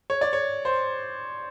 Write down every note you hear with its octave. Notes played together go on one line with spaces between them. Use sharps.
C#5
D5
C#5
C5